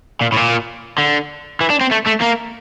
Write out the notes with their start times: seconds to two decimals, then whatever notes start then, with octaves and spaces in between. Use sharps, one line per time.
0.21 A#2
0.32 A2
0.36 A#2
0.98 D3
1.61 E3
1.70 D4
1.81 C4
1.92 A3
2.07 A3
2.22 A#3